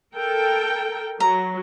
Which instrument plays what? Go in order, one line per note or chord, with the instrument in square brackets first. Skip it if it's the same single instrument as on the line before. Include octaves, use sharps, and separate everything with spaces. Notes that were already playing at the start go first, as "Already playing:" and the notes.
[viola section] A4 A#4 G5
[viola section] F#3 [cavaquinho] A#5